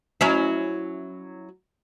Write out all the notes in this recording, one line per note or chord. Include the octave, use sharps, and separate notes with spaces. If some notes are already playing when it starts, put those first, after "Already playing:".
F#3 C#4 E4